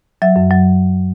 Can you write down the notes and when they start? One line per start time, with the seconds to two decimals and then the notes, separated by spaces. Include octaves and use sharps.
0.22 F#3 E5
0.36 F#2
0.51 F#3